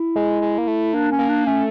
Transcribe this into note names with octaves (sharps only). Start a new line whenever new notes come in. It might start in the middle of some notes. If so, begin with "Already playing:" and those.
Already playing: E4
G#3
G#3
A#3
A3
A#3 D4
C#4
A#3
D4
A3 C#4